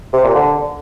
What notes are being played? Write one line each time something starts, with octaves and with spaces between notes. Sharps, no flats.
C3
A#2
D3